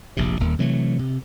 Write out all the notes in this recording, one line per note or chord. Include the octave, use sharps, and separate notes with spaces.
F1 A#1 C3
D#1 D#2 A#3
C3 E3 F#3 A3
C3